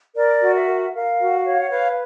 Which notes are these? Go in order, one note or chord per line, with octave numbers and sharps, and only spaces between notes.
A#4 D5
F#4
E5
A#4
A#4 F5
F#4
C#5
F#5
B4 F5